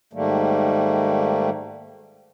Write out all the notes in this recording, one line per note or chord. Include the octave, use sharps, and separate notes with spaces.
G#2 D#3 G3 A3 A#3